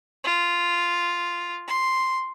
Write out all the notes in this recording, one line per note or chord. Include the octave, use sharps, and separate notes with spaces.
F4
C6